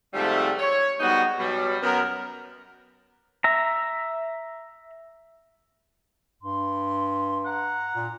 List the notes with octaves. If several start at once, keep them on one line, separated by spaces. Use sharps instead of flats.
G#2 C3 F3 G3 A3
C#5
G#2 G3 B3 D#4 F#4
B2 F#3 G3
F#2 B3 A#4
E5 A#5
G2 C6
F#5 A#5
A#2